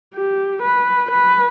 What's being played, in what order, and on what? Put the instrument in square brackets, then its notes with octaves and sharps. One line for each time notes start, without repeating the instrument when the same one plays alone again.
[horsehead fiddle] G4
B4
B4